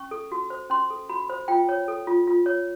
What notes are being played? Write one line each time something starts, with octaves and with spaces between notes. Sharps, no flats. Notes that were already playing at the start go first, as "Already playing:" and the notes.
Already playing: C#4 C#6
A4
F#4
C5
C#4 C6
A4
F#4 B5
C5
F4 G5
C#5
A4
F4
F4
C#5